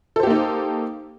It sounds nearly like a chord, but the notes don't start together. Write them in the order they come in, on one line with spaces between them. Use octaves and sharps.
A4 C5 G4 A#3 D#4